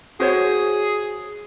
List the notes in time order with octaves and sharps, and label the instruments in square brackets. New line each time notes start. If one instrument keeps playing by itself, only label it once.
[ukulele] F#4 C5 C#5 [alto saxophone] G#4